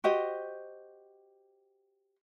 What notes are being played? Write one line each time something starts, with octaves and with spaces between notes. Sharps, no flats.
F#4 G4 C5 D#5